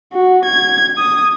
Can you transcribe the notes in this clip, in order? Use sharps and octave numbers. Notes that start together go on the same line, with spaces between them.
F#4
G#6
D#6